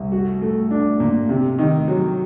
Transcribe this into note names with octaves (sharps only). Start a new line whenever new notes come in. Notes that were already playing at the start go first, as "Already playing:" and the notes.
Already playing: C2
F#4
A3
D4
A#2
C3
D#3
F#3